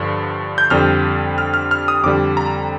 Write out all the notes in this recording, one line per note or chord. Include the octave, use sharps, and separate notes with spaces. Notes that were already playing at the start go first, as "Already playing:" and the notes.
Already playing: G2 D3 F3
G6
F2 D3 G3 F6
F6
F6
F6
D#6
F2 D3 G3 D6
A#5